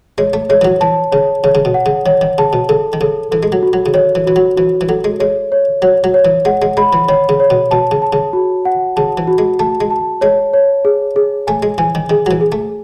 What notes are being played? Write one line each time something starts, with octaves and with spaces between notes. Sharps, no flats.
G#3 C#5
A3
G#3 C#5
E3
F#3
E3 A5
C#3 C#5
C#3 C#5
C#3
B2
F#5
C#3
D#3 C#5
D#3
C#3 A5
B2
C#3 A4
D#3
C#3 A4
E3 A4
G#3
F#3
F#4
F#3
C#3
D#3 C#5
E3
E3 F#4
F#3
E3 F#4
E3
F#3 A4
G#3
G#3 C#5
C#5
F#3 C#5
F#3
C#5
E3
G#3 F#5
G#3
G#3 B5
E3
D#3 C#5
C#3
C#5
B2
B2 A5
C#3
A5
C#3
F#4
F#5
C#3 A5
E3
F#4
G#3
A3 A5
G#3
A5
G#3 C#5
C#5
G#4
G#4
A3 G#5
G#3
E3 G#5
D#3
D#3 G#4
F#3
E3
G#4
A3